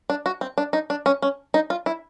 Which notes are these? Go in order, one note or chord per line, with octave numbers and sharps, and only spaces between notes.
D4
F#4
C4
D4
D#4
D4
C#4
C#4
D#4
F4
E4